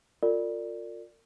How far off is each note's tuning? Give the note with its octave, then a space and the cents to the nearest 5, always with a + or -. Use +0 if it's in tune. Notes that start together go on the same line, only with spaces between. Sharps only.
F4 +25 A#4 -40 D5 +0